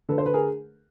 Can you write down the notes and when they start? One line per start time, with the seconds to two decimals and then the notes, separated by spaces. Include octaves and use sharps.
0.09 D3 A4 B4
0.18 C5
0.26 B4
0.34 G#4 A#4